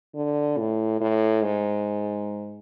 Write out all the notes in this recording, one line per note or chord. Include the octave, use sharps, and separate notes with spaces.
D3
A2
A2
G#2